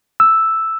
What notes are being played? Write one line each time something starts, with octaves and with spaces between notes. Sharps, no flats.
E6